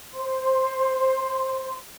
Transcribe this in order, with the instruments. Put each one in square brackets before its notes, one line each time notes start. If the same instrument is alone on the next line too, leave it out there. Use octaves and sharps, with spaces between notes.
[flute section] C5 C6